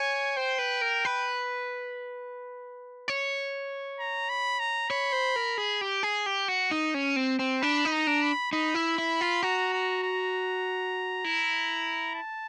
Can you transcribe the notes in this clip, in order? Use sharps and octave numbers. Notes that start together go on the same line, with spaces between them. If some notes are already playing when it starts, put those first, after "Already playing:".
Already playing: C#5 G#5
C5 G5
B4
A#4
B4
C#5
A#5
B5
A#5
C#5 B5
C5
A#4
G#4
G4
G#4
G4
F#4
D#4
C#4
C4
C4
D4 B5
D#4
A#5
D4
B5
D#4 B5
E4
E4
F4
F#4 A#5
A#5
A#5
E4
A5